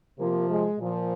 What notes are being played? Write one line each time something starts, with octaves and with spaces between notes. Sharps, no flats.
C3 F3 A#3
G#3
A#2 F3